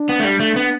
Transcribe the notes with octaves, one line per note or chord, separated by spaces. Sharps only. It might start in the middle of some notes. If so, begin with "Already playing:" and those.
Already playing: D4
B3
A3
G3
A3
B3